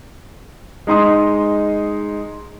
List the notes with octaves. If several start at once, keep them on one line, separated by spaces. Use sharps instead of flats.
G#3 D#4 C6 D#6